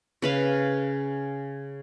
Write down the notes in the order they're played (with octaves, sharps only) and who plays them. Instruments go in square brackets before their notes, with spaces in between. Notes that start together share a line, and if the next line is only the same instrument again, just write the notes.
[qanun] C#3 B4 F5